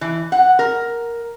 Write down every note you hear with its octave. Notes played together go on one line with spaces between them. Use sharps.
E3
F#5
A#4